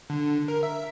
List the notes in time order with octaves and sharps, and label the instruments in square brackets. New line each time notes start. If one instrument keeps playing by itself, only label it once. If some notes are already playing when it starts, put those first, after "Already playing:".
[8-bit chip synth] D3
A#4
E5